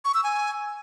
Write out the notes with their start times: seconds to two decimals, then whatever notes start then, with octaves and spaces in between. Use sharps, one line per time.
0.05 C#6
0.14 E6
0.24 G#5